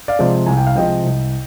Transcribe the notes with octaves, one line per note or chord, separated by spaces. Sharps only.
D5 F5
C3 F3 G#3
C2 G#5
G5
F5
C3 F3 G#3 D#5 G5
C2